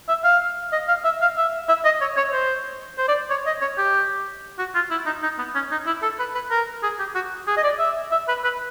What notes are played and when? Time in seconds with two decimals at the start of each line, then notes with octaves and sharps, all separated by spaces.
0.09 E5
0.24 F5
0.72 D#5
0.88 F5
1.05 E5
1.21 F5
1.37 E5
1.68 E5
1.85 D#5
2.01 C#5
2.17 C#5
2.33 C5
2.98 C5
3.08 D5
3.30 C#5
3.46 D#5
3.61 C#5
3.78 G4
4.59 F#4
4.75 F4
4.91 E4
5.06 D#4
5.23 D#4
5.39 B3
5.55 C#4
5.71 D#4
5.86 E4
6.02 A4
6.19 B4
6.35 B4
6.51 A#4
6.83 G#4
6.99 G4
7.15 F#4
7.47 G#4
7.57 D#5
7.64 D5
7.79 E5
8.12 E5
8.28 B4
8.44 B4